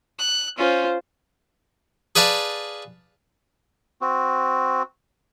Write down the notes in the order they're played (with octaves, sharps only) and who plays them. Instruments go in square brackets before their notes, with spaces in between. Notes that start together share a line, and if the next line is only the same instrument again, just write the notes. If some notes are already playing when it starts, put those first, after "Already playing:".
[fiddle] F#6
[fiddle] C#4 [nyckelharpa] F4 C5
[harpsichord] G#4 B4 D5 F5 A5
[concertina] C4 F#4